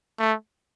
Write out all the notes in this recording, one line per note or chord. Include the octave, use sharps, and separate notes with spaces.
A3